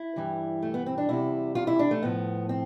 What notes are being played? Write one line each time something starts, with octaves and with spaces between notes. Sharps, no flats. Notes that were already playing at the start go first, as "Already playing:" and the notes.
Already playing: E4
G2 E3 G3
A3
B3
C4
D4
E2 C3 G3 E4
F4
E4
D4
A3
A2 F3 B3
C4